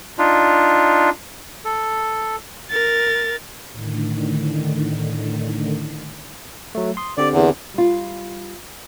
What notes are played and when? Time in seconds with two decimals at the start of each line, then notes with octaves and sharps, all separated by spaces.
0.19 D4 D#4 F4
1.65 A4
2.71 A#4 A6
3.72 A2 D3 D#3
6.75 F#3 A3
6.97 C6 D#6
7.18 D3 C4 G4 D5
7.32 E2
7.74 G3 F4